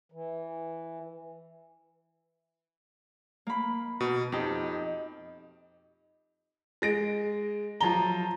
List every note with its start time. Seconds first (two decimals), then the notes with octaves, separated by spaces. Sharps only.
0.12 E3
3.47 A#3 B5
4.00 B2
4.32 F2 D#4 G4
6.82 G#3 A#6 D7
7.81 F3 F#3 A5 A#5 G7